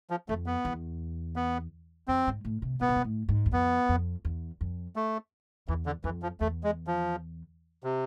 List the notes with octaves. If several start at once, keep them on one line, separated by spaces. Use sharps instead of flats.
F3
F2 A3
B3
E2
B3
F2 C4
G#2
A2
C3
B2 B3
C3
B2
A2
G#2
E2
F2 B3
F2
E2
F2
A3
E2 E3
D3
F2 E3
F3
E2 A3
G#3
F3
C3